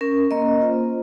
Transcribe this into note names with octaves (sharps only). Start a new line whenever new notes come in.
C#4 A#4
A#3 D#5
F4 C5